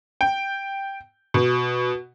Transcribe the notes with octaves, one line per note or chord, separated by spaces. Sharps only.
G5
B2